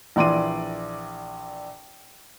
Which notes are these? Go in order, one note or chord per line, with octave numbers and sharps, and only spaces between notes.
A#1 E3 D5 C6 D6 D#7